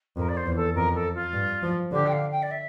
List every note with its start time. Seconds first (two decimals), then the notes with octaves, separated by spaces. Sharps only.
0.17 F2 A#4
0.28 D5
0.36 C5
0.45 E2
0.56 A4
0.75 F2 A#4
0.94 A4
1.14 F4
1.33 G2
1.63 F3
1.91 D3 G4
2.06 G5
2.11 F5
2.31 G5
2.42 D5
2.50 E5